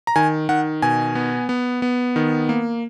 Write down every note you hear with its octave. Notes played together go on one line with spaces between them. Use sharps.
A#5
D#3 G#5
D#3 F#5
B2 G#5
B3
B3
B3
D#3
A#3